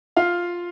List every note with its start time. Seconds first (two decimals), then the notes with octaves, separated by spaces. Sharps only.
0.17 F4 F5